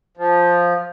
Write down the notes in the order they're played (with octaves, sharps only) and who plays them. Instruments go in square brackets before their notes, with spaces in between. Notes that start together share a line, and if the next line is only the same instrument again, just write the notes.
[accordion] F3